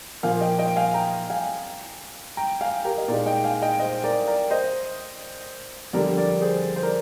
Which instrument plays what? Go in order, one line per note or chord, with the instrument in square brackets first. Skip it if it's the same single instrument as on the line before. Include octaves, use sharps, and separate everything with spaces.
[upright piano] A#2 F3 A#3 [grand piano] F5 G#5
[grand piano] D#5 G5
D#5 G5
F5 G#5
G5 A#5
F5 G#5
G5 A#5
F5 G#5
G4 A#4
D#5
[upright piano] A#2 G#3 D#4 [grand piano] A#4 D5
[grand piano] D#5 G5
F5 G#5
D#5 G5
C5 D#5
A#4 D5
A#4 D5
C5 D#5
[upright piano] F2 D3 G3 [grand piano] A#4 D5
[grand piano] A#4 D5
G#4 C5
C5
A#4 D5